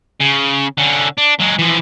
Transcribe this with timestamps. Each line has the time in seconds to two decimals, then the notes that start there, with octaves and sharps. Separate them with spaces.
0.20 C#3
0.78 D3 C#4
1.18 D4
1.40 F#3 G#3
1.59 E3 F3